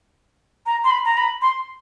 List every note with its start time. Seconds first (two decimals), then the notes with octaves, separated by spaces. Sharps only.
0.66 A#5
0.84 C6
0.91 B5
1.05 A#5
1.17 B5
1.42 C6